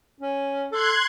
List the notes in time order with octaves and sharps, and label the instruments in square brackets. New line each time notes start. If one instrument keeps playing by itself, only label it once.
[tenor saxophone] C#4
[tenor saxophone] A4 [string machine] C6 F#6 G#6